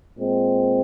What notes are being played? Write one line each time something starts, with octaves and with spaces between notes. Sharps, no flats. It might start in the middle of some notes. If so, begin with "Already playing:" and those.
A#2 G#3 C4